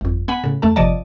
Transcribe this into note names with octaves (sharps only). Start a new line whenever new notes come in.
G1 F2
B3 F#5 G#5 B5
A2 C#3
E2 A3 A4 A5
G1 C3 F3 D5 D#5 A5